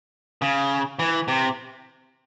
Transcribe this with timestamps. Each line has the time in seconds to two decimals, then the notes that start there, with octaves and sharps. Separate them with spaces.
0.42 C#3
0.99 E3
1.28 C3